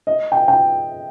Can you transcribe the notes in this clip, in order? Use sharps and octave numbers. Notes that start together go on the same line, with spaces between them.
D#5
G5
G5